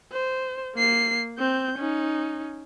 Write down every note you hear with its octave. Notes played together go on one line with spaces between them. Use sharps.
C5
A#3 C7
C4 G6
C#4 D#4